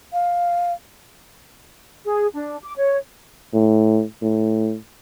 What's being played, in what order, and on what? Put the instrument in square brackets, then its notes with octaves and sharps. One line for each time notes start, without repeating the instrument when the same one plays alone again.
[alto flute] F5
[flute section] G#4
D4
D6
C#5
[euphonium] A2
A2